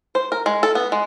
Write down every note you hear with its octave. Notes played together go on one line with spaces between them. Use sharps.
C5
A#4
G#3
A4
B3
G#3